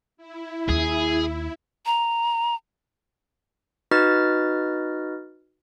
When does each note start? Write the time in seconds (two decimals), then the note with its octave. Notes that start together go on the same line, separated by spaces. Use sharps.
0.17 E4
0.69 D#2 C#4 G#4
1.86 A#5
3.91 D#4 F#4 B4 D#5 F6 A6